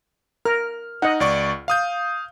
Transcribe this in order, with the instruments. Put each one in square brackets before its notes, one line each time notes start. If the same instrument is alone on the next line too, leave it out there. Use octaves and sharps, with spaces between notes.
[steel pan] A#4 [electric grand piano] F6
[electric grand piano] D#4 [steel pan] D#5 F#5
[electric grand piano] C#2 D5 C#6
F5 D#6 G6